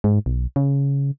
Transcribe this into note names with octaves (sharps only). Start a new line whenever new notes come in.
G#2
B1
C#3